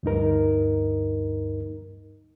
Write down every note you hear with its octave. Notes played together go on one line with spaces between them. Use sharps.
D2 G2 D#4 A#4